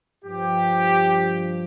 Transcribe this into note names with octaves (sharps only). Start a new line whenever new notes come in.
G2 F3 G4